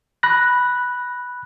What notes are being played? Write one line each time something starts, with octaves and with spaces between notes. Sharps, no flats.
B5 F#6 A#6